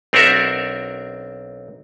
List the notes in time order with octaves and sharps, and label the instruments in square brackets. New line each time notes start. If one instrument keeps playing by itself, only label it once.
[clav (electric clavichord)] B1 C4 D4 F#4 A#4 E5